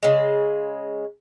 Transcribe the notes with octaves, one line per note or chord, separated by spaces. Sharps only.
C#3 G#3